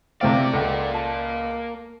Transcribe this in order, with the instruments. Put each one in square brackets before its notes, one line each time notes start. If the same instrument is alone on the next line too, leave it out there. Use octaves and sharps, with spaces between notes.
[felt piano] C3 A3 F5 [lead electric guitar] A#3 D5 [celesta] E4 C5 G5
[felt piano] C#2 [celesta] A4 F#5 G5
[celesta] A5